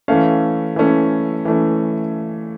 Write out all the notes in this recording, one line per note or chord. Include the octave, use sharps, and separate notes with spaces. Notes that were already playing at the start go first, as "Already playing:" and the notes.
E3 A3 C#4 F5
E3 A3 C#4
E3 A3 C#4